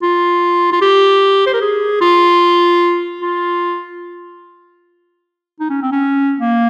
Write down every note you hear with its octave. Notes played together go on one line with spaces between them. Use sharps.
F4
F4
G4
C5
A#4
G#4
F4
F4
D#4
C#4
C4
C#4
A#3